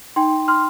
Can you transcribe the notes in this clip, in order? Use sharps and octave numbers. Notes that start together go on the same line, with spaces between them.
D#4 G5 C6
C6 F6